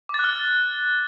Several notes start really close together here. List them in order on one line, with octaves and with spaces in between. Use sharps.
D6 A6 F#6 F6